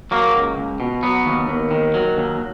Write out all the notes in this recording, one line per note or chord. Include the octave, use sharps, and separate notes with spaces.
F#3 A#3
C#2
C#2
B2
F#3 B3
D#2
D#2
D#3
F#3
D#2